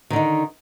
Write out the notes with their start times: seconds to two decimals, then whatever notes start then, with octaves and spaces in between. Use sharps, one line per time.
0.10 D#3
0.13 D3
0.16 D#4